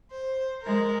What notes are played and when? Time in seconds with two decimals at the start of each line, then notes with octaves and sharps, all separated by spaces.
0.11 C5
0.62 G#3 A#4